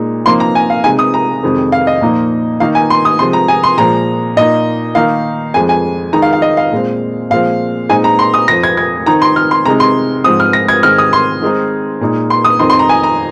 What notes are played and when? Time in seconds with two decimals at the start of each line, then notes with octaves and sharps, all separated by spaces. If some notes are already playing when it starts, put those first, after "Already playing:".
Already playing: A#2 G#3 D#4
0.25 C3 F3 A#3 D#4 C6
0.40 A#5
0.55 G#5
0.70 F5
0.84 C3 G#3 D#4 G#5
0.99 D#6
1.14 A#5
1.43 F2 C3 D#3 G#3 C4
1.72 F5
1.87 D#5
2.01 A#2 F3 A#3 D#4
2.60 D#3 A#3 D#4 F5
2.75 G#5
2.90 C6
3.05 D#6
3.19 C3 F3 G#3 C4 C6
3.33 A#5
3.48 G#5
3.64 C6
3.78 A#2 F3 G#3 A#5
4.36 A#2 A#3 D#4 D#5
4.95 D#3 A#3 D#4 F5
5.54 F2 F3 G#3 G#5
5.69 G#5
6.13 D#3 G#3 D#4 A#5
6.22 F5
6.33 F5
6.42 D#5
6.57 F5
6.72 A#2 G#3 C4
7.30 A#2 F3 G#3 C4 F5
7.89 A#2 G#3 C4 D#4 G#5
8.04 A#5
8.19 C6
8.34 D#6
8.48 F2 F3 C4 A#6
8.63 G#6
8.77 G#6
9.06 D#3 C4 D#4 A#5
9.22 C6
9.36 F6
9.51 C6
9.66 C3 G#3 D#4 A#5
9.80 C6
10.24 G#2 F3 C4 D#6
10.40 F6
10.53 A#6
10.68 G#6
10.83 G#2 D#3 G#3 C4 F6
10.98 D#6
11.13 C6
11.42 D#3 G#3 C4 D#4
12.01 A#2 G#3 D#4
12.30 C6
12.45 D#6
12.59 F2 D#3 C4 D#4 C6
12.70 C6
12.79 A#5
12.89 G#5
13.04 A#5